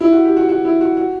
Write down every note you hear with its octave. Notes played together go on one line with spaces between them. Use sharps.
E4
F#4
G4
F#4
F#4
E4
F#4
F#4